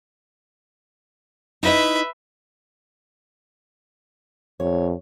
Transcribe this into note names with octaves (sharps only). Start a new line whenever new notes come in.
D#4 E4 B4 D#5 E5
F2 C#5